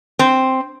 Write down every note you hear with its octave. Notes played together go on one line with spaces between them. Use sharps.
C4